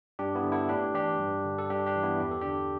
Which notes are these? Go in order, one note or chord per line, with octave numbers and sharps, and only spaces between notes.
G2 D4 G4
B3 E4
D3
E4 A4
A2 D4 G4
E3 D4 G4
G2
D3
A4
G2 D4 G4
D4 G4
E3
B3 E4
E2 G4
A4
D3 D4 G4